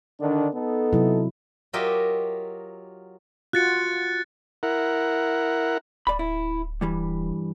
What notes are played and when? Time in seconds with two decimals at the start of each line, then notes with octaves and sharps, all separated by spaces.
0.21 D3 D#3 D4
0.54 B3 D#4 A4
0.93 C3 F#3 E4
1.73 F#3 F4 G4 A#4 D#5 E5
3.53 F4 F#4 F#6 A6 C#7
4.63 E4 A#4 F#5
6.07 D1 D5 B5
6.19 E4
6.81 G2 E3 G3